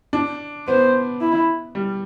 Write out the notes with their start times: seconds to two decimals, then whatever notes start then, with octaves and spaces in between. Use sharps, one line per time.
0.13 D4
0.68 B3 C5
1.21 E4
1.75 G3